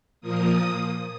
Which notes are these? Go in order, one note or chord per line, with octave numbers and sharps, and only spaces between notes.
A#2 F3 A#3 D#6